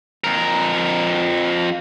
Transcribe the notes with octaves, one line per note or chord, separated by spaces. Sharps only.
F2 A#4